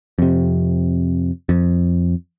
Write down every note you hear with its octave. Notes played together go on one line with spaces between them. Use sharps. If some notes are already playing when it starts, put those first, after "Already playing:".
F2 C3
F2